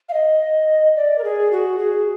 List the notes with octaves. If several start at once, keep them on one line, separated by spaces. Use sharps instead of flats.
F5
D#5
D5
A#4
G#4
F#4
G#4